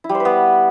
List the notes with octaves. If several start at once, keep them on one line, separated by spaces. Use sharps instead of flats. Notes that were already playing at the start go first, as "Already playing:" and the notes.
E4
G3
C5
B4
B3